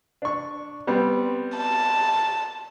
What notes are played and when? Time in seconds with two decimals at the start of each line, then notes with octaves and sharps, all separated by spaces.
0.22 D4 C#6
0.87 G3 B3 C4
1.57 A5